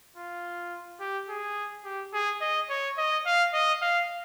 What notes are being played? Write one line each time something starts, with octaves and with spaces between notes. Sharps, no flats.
F4
G4
G#4
G4
G#4
D#5
C#5
D#5
F5
D#5
F5